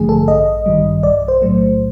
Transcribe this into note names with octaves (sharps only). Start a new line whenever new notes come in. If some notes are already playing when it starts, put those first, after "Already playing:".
Already playing: A1 G2 D3 F3 A3 G#4
A4
A1 D#5
G2 D#3 G3
B1 D5
C5
A2 F#3 A3